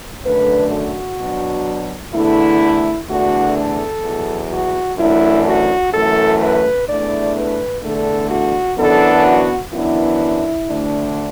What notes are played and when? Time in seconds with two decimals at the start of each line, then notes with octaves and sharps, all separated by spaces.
0.25 F#2 D3 A3 D4 B4
0.72 F#4
1.20 B2 F#3 D4
2.14 E2 D3 A3 E4
3.09 E2 D3 A3 D4 F#4
3.57 A4
4.05 E2 B2 F#3
4.51 F#4
4.99 F#2 E3 A3 D4 E4
5.47 F#4
5.93 F#2 E3 A3 A4
6.41 B4
6.88 E2 E3 A3 D4 D5
7.36 B4
7.83 E2 D3 A3 D4 A4
8.30 F#4
8.78 F#2 E3 B3 D4 A4
9.25 F#4
9.73 F#2 E3 B3 D4 E4
10.68 D2 D3 A3 D4